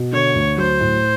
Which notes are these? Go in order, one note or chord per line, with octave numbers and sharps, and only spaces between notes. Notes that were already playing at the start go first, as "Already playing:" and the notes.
Already playing: B2
D3 C#5
D2
F#3 C5
A2